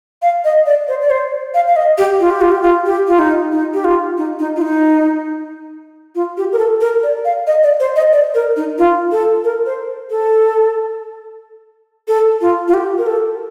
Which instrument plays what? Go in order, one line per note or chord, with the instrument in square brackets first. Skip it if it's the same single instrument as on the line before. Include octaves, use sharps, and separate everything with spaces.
[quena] F5
D#5
D5
C5
D5
C5
F5
F5
D#5
G4
F4
G4
F4
G4
F4
G4
F4
D#4
D#4
G4
F4
D#4
D#4
F4
D#4
F4
G4
A#4
A4
A#4
D5
F5
D#5
D5
C5
D#5
D5
A#4
D#4
F4
A4
A#4
C5
A4
A4
F4
F4
G4
A#4
A4